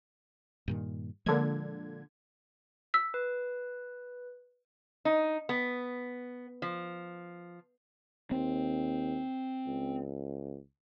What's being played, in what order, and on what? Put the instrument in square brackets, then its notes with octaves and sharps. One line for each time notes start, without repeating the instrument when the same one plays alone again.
[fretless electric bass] G2 A#2 D#3
[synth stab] A#2 D3 G#6 [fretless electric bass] F3 G#3
[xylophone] E6 B6
[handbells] B4
[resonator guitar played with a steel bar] D#4
B3
F3
[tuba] D#2 [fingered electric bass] C4
[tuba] C#2